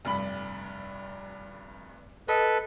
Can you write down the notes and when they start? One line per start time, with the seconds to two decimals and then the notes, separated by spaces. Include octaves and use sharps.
0.05 F1 G2 B5
2.28 A4 B4 D#5